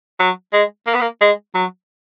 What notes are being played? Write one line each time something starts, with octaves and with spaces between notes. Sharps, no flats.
F#3
G#3
A#3
B3
A#3
G#3
F#3